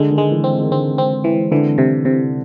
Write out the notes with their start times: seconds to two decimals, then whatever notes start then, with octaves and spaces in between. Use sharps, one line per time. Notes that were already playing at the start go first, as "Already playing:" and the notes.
Already playing: D3 G#3
0.11 D#3
0.18 G#3
0.32 E3
0.44 C4
0.61 D#3
0.71 D3 C4
0.98 C4
1.24 E3
1.51 D3 E3
1.78 C3
2.05 C3